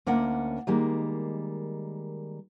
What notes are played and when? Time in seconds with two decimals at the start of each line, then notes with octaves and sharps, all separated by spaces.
0.06 D2 A#3 C#4 D4 F#5
0.67 D#3 G3 G#3 A#3